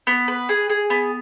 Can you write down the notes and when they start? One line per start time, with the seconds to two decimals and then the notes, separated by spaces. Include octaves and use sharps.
0.07 B3
0.28 B4
0.49 G#4
0.69 G#4
0.90 B3